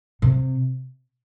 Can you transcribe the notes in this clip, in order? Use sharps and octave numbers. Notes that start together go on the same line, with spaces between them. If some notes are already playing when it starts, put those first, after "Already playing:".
C3